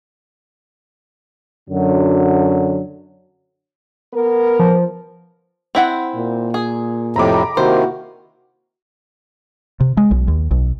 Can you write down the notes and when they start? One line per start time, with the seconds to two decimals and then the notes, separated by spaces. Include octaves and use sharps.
1.70 F#2 D3 F#3
4.14 B3 A#4
4.59 F3
5.75 C4 E4 F#5
6.15 A#2
6.54 G#4
7.16 F2 A2 C3 A#5 B5 D6
7.57 C3 D#3 A#3 E4 F#4 C5
9.80 C3
9.97 G#3
10.11 B1
10.28 D#2
10.51 B1